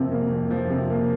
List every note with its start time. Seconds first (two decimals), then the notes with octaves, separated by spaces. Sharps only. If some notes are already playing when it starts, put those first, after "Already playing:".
Already playing: F2 C3 F3 A#3
0.11 A#3
0.32 F2
0.50 F3
0.70 C3
0.90 A#3